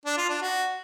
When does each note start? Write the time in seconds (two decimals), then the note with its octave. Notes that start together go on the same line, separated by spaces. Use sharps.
0.06 D4
0.18 F4
0.29 D4
0.41 F#4